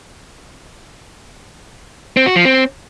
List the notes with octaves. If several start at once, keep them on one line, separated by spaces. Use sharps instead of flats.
C4
F#4
F3
C4